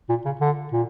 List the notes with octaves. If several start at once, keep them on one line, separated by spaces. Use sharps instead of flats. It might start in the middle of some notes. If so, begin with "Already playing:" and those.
A#2
C#3
D3
A#2